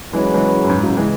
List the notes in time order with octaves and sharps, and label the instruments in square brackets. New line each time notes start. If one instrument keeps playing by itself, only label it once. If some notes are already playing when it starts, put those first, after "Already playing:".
[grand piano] E3 G#3 [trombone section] F#3 C#4 G#4 B4
[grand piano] E3 G#3
F#2
G#2
C#3 F#3
E3 G#3